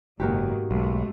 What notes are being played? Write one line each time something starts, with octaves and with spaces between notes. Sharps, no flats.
F#1 G#2 B2 D#3 A#3 F#4 G4
B1 F#2 G#3 A3